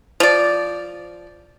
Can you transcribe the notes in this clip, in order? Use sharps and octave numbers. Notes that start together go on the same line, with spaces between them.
F3 D5